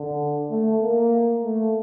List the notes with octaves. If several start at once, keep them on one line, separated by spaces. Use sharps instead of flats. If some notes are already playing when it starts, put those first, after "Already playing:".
Already playing: D3
A3
A#3
A3